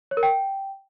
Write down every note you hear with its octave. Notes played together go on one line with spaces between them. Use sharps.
C#5
A#4
G5